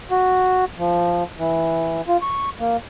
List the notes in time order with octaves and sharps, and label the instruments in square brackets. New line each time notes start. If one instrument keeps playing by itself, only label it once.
[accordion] F#4
F3
E3
F4
C#6
A#3